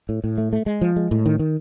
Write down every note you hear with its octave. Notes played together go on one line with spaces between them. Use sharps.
A2
A2
A3
A3
G#3
F3
G#3
A2
D#3
D#3